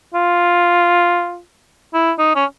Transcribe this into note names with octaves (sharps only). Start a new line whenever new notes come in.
F4
E4
D#4
C#4